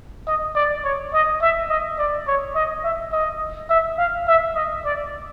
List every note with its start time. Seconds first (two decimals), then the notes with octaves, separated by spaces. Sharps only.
0.27 D#5
0.55 D5
0.84 C#5
1.14 D#5
1.42 E5
1.69 D#5
1.98 D5
2.27 C#5
2.55 D#5
2.84 E5
3.12 D#5
3.70 E5
3.98 F5
4.28 E5
4.55 D#5
4.84 D5